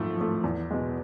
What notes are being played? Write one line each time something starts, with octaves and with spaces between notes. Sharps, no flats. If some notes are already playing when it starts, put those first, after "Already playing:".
Already playing: G#2 F3 A3
F3 A3
E2
B2 G#3